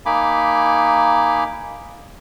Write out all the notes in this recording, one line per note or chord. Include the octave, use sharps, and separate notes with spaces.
A#3 D#4 G#5 B5 D6